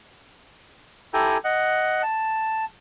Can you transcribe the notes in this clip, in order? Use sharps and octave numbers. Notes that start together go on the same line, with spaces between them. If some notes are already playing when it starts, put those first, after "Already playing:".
E4 G4 A4 G5 G#5 A#5
D#5 F#5
A5